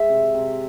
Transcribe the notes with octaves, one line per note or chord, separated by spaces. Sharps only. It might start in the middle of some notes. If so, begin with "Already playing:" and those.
Already playing: G#3 E5
C3
C3